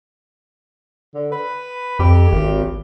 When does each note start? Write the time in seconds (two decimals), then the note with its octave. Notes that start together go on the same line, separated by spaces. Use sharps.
1.14 D3
1.32 B4
1.99 F2 G4
2.32 G#1